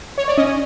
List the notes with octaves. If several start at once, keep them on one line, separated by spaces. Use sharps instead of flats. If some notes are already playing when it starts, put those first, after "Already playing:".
C#5
D5
C#4 D#5